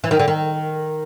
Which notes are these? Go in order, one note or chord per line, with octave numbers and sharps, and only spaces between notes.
E3
D#3
D3
D#3